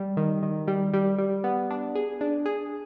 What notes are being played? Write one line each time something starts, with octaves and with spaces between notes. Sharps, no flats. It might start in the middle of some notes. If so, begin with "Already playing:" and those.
Already playing: G3
D#3
D#3
G3
G3
G3
B3
D4
G#4
D4
G#4